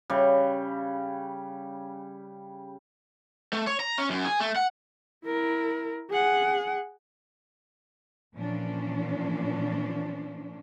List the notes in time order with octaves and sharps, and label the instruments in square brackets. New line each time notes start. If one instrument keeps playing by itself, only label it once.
[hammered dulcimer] C#3 G3
[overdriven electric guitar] A3
C#5
A#5
C#4
F#2
G#4
A3
F#5
[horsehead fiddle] E4 A#4
G#4 F#5
[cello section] A#2 E3 F3 C#4 D4